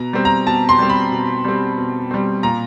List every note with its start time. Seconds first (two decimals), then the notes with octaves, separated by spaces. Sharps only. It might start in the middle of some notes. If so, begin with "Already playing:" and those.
Already playing: B2 A#5
0.13 G3 C4
0.25 A#5
0.47 B2 A5
0.69 C6
0.79 G3 C4
0.89 B5
1.12 B2
1.45 G3 C4
1.77 B2
2.11 G3 C4
2.43 A#2 A#5